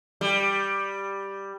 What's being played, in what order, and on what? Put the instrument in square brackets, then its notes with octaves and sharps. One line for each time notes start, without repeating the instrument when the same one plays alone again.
[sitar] G3